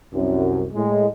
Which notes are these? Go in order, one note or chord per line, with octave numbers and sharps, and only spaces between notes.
C2 F#2
A2 G#3